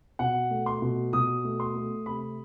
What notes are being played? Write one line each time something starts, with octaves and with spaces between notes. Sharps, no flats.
B2 F#5
A3
C6
B2
B2 D#6
A3
C6
A3
C3 B5